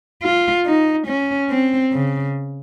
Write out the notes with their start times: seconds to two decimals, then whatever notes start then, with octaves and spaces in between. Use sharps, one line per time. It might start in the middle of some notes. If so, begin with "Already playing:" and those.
0.22 F4
0.65 D#4
1.07 C#4
1.50 C4
1.92 C#3